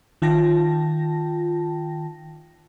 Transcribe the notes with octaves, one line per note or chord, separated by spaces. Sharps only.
D#3 F4 G5 A5 A#6